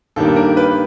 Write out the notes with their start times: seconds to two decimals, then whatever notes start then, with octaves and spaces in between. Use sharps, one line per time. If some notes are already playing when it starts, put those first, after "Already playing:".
0.16 G2 D#3 G3 A#3 A4
0.36 A#4
0.57 B4